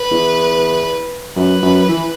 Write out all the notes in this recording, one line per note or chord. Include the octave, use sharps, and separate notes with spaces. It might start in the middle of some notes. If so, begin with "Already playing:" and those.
Already playing: B4
E2
F#2 B4
F#2
E3